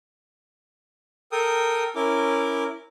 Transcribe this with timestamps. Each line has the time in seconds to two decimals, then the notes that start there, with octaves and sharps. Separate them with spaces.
1.32 A4 A#4 G5 D#6
1.95 C#4 E4 A#4 D6